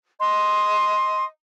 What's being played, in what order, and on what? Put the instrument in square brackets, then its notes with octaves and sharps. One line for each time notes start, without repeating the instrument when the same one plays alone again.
[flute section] D#5 C6